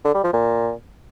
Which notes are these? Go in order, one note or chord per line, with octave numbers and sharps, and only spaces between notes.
D3
G3
F3
A#2